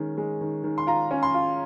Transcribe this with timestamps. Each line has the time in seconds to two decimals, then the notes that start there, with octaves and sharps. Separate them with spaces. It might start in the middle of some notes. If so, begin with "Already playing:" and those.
Already playing: D#3 G#3 C#4
0.17 G#3
0.41 D#3
0.64 D#3
0.78 C6
0.87 F4 A#5
1.11 C#4
1.23 C6
1.34 F4